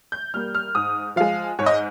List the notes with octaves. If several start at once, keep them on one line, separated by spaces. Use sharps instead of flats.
G6
G3 A#3 F6
F6
G#2 D#6
F3 G#3 F5
G#2 C#5
D#5